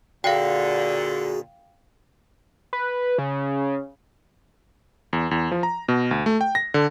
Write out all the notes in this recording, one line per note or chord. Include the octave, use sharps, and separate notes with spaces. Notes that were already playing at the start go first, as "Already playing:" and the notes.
A#2 D3 F#4 G#4 F5 G5
B4
C#3
E2
E2
F3
A#5
B2
D2
A3
G5
A#6
D3